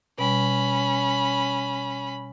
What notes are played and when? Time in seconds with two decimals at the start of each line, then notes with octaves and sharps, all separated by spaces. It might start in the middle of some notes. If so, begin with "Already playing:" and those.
0.18 B2 G3 C#4 B5